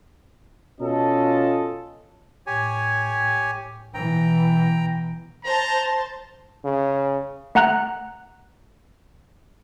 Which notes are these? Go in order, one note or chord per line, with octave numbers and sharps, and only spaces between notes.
B2 C#4 F4 A4 D#5 A5
A2 G4 C#5 G#5
B2 E3 G5 A#5
C5 A5 A#5
C#3
A3 F#5 A#5 F#6